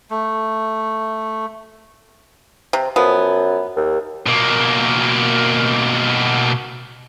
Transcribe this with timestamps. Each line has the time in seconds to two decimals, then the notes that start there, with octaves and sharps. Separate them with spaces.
0.10 A3
2.73 C3
2.96 F#2 F3 B3
3.76 D#2
4.26 B2 A#3